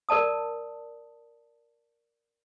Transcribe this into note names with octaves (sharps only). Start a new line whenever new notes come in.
A#4 D5 A5 D#6